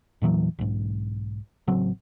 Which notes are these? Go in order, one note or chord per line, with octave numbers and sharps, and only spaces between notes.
E2 A#2 E3 F#3
B1 G#2
A1 C#3 F#3 C4